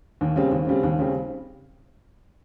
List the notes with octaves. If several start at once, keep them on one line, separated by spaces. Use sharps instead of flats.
D#2
C#3 G3 C4
D#2
C#3 G3 C4
D#2
C#3 G3 C4